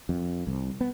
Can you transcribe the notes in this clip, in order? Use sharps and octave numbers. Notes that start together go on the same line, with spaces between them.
F2
C2
B3